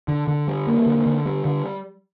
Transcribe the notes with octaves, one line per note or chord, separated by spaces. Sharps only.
D3
D3
G3
A#3
D3
D3
G3
D3